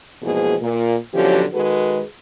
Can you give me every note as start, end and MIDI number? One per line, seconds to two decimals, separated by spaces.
0.22 0.54 40
0.22 0.54 44
0.22 0.54 47
0.22 0.54 53
0.22 0.54 58
0.22 0.54 68
0.61 0.95 46
1.14 1.43 47
1.14 1.43 50
1.14 1.43 53
1.14 1.43 54
1.14 1.43 61
1.14 1.43 67
1.54 2.03 51
1.54 2.03 56
1.54 2.03 66
1.54 2.03 68
1.54 2.03 69
1.54 2.03 71